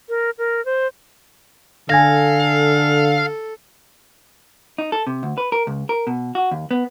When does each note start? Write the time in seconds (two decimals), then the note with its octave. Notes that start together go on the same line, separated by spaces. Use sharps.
0.09 A#4
0.38 A#4
0.65 C5
1.90 D3 A4 F5 G#5 G#6 A#6
4.78 D#4
4.92 A4
5.07 C3
5.23 D2
5.38 B4
5.52 A#4
5.67 C#2
5.89 A#4
6.07 B2
6.35 F#4
6.51 D#2
6.71 B3